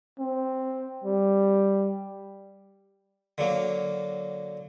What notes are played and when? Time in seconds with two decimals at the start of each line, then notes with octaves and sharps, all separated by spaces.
0.20 C4
1.04 G3
3.38 D3 F#3 A#3